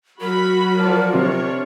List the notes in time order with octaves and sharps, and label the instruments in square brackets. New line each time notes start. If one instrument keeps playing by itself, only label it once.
[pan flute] F#3 [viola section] F#4 B5 [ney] A#4
[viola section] F3 F#4 D5 [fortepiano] A5
[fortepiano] C3 [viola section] D4 C#5